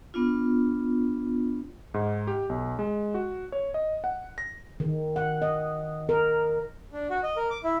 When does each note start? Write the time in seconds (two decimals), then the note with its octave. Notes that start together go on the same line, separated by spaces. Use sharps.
0.14 B3 D4 F4
1.94 G#2
2.27 G4
2.49 B1
2.79 G#3
3.14 F#4
3.52 C#5
3.74 D#5
4.04 F#5
4.38 A#6
4.80 D#3
5.16 F#5
5.42 D#5
6.09 A#4
6.93 D4
7.10 F#4
7.23 D#5
7.37 A#4
7.51 D6
7.64 E4